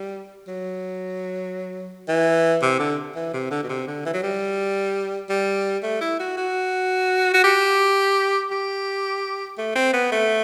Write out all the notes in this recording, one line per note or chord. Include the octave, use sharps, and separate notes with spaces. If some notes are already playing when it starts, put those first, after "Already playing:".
Already playing: G3
F#3
E3
C3
D3
E3
C3
D3
B2
C3
D3
E3
F#3
G3
G3
A3
E4
F#4
F#4
F#4
G4
G4
A3
C4
B3
A3